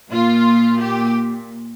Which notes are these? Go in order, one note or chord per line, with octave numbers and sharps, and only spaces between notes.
A#2 F4
G4